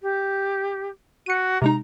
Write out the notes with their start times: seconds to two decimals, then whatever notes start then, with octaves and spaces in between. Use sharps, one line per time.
0.01 G4
1.26 F#4 C#7 D#7
1.62 C3 G#3 D#4 A#5